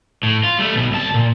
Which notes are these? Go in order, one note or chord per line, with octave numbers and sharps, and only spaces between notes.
A2
F4
G3 A3
B1 B2
C2 A5
A#2